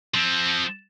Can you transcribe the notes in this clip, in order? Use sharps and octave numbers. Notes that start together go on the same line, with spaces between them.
F3 C4